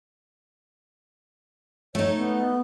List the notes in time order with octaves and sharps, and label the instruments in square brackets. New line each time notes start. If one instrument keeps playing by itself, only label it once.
[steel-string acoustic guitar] A3 D#4 [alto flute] C#5
[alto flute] B3